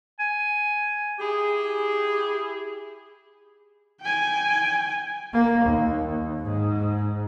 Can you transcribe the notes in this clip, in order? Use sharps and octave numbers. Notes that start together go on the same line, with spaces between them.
G#5
E4 G4 G#4
G5 G#5
A#3
D#2
G#2